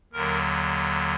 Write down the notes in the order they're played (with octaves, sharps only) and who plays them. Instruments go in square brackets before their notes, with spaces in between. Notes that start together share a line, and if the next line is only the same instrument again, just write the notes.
[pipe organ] D#2 D3 F#3 A#4